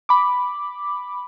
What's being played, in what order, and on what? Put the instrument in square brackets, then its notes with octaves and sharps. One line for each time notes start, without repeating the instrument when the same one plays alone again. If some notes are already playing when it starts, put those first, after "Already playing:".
[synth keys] B5 D6